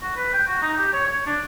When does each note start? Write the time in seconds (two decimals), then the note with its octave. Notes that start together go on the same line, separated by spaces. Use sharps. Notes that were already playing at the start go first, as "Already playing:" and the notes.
0.01 F#4
0.16 B4
0.33 G5
0.47 F#4
0.62 D#4
0.77 G4
0.93 C#5
1.07 C#5
1.27 D4